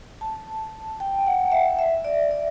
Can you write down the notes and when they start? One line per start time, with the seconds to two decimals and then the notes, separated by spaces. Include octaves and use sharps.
0.21 A5
1.00 G5
1.27 F#5
1.52 E5
1.79 E5
2.05 D5
2.31 D5